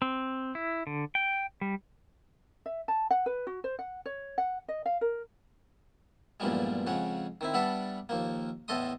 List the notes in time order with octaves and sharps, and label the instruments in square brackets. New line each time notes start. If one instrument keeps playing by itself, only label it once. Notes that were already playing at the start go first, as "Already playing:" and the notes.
[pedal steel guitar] C4
E4
D3
G5
G3
[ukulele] E5
A5
F#5
B4
F#4
C5
F#5
C#5
F#5
D#5
F5
A#4
[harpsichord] E2 G2 A#2 F3 G3 G#3
F2 C#3 G#3 F#5
D#3 C4 E4
G3 B3 D4 A4 E5 F#5
D#2 F3 A#3
E2 A2 A4 D#5 C6 D#6